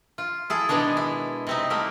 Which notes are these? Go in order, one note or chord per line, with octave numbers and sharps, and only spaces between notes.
F4
E4 G#4 A4
B2 D#3 G#3 B3 D4
E4
C3 C4 D#4
G3 A3 A#3 E4